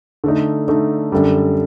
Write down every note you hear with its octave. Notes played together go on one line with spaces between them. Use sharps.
D3 A3 D#4
D3 A3 D#4
F#2 D3 G3